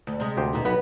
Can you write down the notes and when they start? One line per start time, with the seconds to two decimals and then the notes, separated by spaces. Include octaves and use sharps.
0.07 D2
0.20 C3 G#3
0.37 D2 G4 C5
0.53 B2 D#4
0.65 B1 B3 F#4 B4